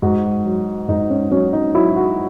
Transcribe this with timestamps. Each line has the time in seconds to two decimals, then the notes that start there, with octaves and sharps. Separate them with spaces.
0.02 G#2 F#4
0.46 F#3
0.89 G#2 D#4
1.10 C#4
1.31 F#3 C#4
1.53 D#4
1.74 F#3 E4
1.96 F#4